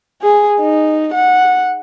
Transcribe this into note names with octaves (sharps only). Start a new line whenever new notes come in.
G#4
D#4
F#5